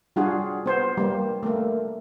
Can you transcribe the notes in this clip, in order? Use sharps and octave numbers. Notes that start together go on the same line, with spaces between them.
G3 D4 F4 F#4 G#4
B3 C5
G3 A#3
A3 A#3